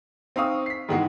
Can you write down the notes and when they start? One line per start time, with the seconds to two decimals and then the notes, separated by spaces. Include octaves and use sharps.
0.36 C4 D#4 F5 C#6 D#6 E6
0.66 B6 C7
0.88 G#2 D#3 E3 G#3 B3 F#4